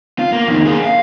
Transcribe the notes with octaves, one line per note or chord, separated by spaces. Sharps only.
F4
A#3
F2 D#3
A#3 G#4
F5